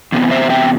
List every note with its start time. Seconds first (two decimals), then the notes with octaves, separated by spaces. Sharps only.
0.12 E2 C3 B3
0.31 C5 E5
0.50 E5 G5